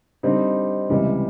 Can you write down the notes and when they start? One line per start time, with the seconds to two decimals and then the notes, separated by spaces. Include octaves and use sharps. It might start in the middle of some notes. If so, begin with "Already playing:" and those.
0.23 D3 G3 C4 D#4
0.90 C#2 C3 E3 G3